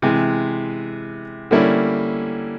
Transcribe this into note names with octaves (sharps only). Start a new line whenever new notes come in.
C3 E3 G#3
D3 G3 A#3 C#4 E4